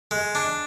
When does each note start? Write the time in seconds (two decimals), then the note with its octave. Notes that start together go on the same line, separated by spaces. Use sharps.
0.11 G#3
0.35 D4